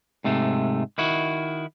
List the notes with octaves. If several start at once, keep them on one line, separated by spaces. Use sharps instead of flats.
G#2 C3 A3
D#3 E4 F#4